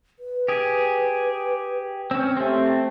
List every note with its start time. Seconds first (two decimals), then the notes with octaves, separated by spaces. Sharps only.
0.19 B4
0.48 G4 G#4
2.11 C4 C#4
2.37 A3 C4 G4